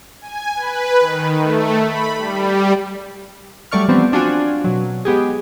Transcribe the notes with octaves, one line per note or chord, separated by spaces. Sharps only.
G#5
B4
D#3
A3
B5
G3
F#3 G3 A3 D5 C#6 F6
E3 F3 G3 B3 C4 D4
C4 D4 F4 F#4 G#5
B2 F#3
G#3 B3 G4 G#4